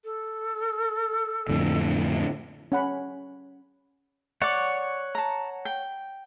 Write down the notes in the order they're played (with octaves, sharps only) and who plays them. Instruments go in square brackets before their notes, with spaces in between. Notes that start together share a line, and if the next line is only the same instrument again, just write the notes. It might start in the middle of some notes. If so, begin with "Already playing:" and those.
[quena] A4
[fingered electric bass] F2 A2 D3
[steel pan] C#4 F#5 B5
[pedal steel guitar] C#5 F#5 [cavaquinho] D5 D6
[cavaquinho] A5 A#5
G5